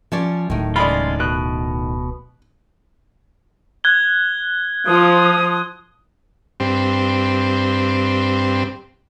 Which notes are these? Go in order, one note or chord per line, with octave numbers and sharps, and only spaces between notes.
F3 C#4 D5
D1 A2 D#3
C#3 G#3 F4 D5 B5
B2 F#6
F#6 G#6 G7
F3 D#6
G2 C4